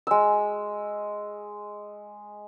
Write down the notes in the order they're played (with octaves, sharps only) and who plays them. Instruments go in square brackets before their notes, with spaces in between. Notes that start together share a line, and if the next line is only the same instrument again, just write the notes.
[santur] G#3 E6